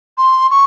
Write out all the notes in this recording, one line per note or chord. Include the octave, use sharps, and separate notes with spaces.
C6
C#6